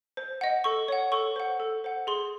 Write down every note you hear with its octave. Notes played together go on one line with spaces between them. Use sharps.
C5
D#5 F#5
A4 C#6
C#5 F#5
A4 C#6
C5 F#5
A4
C5 F#5
G#4 C6